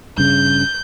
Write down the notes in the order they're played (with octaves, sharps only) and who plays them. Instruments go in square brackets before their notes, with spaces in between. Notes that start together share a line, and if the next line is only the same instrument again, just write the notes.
[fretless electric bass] G2 C#3 [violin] G6